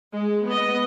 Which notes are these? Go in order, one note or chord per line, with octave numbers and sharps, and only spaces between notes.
G#3
B3 D#5